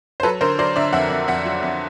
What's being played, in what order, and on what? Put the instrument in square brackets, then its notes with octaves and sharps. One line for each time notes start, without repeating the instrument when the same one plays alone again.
[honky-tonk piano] C5
F#3 A4 B4
D3 A#4 C5
F#3 C5 D5
D3 D5 E5
F2 E5 F#5
F2
F2 E5 F#5
F#3
F2